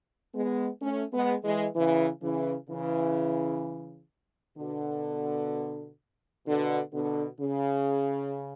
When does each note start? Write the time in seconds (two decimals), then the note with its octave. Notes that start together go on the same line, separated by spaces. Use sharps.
0.35 G#3 B3
0.81 A3 C#4
1.13 G#3 B3
1.44 E3 G#3
1.75 C#3 E3
2.22 C#3 E3
2.69 C#3 E3
4.58 B2 D3
6.46 B2 D3
6.93 B2 D3
7.41 C#3